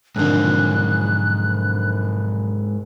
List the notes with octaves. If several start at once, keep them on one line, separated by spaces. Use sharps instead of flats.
B1 F2 G#2 D3 A#3 F#6